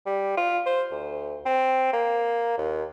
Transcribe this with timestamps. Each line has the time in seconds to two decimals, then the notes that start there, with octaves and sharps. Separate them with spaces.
0.06 G3
0.37 F4
0.66 C5
0.91 D2
1.46 C4
1.93 A#3
2.58 D#2